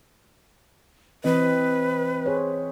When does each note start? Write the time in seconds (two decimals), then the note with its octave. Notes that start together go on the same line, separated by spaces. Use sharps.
1.24 E3 C4 B4 D#5
2.26 G#4 C5 C#5